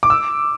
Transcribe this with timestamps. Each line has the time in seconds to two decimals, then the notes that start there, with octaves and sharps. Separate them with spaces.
0.03 D6
0.10 E6